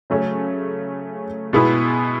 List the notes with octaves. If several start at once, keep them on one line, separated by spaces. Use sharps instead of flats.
C#3 F#3 A3 C#4
B2 G#3 B3 E4